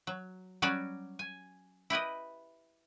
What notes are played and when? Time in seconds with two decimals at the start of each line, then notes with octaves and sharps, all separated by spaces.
0.07 F#3
0.62 F#3 G3 C#4 F#4 C#5 D5
1.19 G#5
1.90 E4 G4 B4 D#5